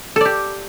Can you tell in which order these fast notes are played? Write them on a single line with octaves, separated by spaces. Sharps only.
A4 D5 G4